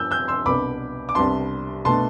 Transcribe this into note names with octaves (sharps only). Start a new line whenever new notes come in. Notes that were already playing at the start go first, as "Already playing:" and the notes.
Already playing: G2 F3 B3 D4 E6 G6
E6 G6
C6 E6
C2 B2 B3 D4 B5 D6
D6
C2 C3 G3 B3 D4 A5 C6
B2 A3 D4 A5 C6